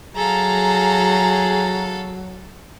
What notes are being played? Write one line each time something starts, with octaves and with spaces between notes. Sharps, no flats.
F#3 G#4 A4 F5 A#5